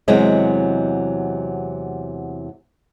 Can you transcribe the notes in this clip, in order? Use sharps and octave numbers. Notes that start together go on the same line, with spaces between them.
E2 C3 F#3 G#3 D#5